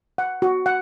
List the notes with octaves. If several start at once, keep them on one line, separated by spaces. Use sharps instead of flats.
F#5
F#4
F#5